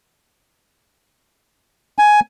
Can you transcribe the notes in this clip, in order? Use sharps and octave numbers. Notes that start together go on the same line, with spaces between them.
G#5